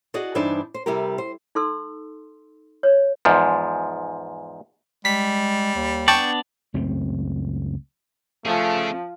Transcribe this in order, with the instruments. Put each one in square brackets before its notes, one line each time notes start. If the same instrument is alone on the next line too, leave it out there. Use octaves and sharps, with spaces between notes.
[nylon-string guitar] F#4 G#4 D5 D#5
G2 E3 D4 D#4 C5 D5
C5
C3 G3 E4 G4 A#4
C5
[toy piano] D#4 A4 C6 E6
C#5
[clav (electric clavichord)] E2 G#2 F3
[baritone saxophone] G3 [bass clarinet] G#3 [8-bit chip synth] B6
[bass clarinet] D#2
[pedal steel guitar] B3 D4 D5 [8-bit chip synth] G5 A5 C#6
[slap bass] C#2 F#2 A3 C4
[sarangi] F3 [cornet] A3 [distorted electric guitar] C#4 G#4